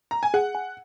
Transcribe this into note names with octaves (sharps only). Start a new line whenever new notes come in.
A#5
G#5
G#4 F#5
G#5